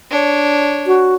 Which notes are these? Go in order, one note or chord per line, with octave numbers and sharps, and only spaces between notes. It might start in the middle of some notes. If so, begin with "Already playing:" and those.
D4 C#5
F#4